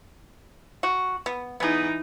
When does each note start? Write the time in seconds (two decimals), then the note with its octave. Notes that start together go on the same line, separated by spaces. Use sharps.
0.83 F#4
1.26 B3
1.60 E3 B3 D#4 G#4